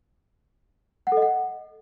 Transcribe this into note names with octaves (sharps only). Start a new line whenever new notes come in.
F#5
A4
D#5
F#5